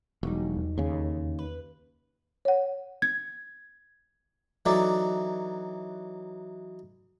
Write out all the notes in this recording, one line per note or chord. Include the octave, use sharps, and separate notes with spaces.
E1 F#3 G3 D#4
E2
D#2 C#3
B4
C#5 F#5
G#6
E3 F#3 D#4 A4 D5